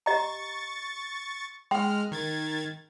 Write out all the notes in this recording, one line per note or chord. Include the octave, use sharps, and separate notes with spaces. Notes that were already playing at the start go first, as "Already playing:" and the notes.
G4 D#5 A#5 C#6 A6
G#3 G5 C6 F6
D#3 G#6 A6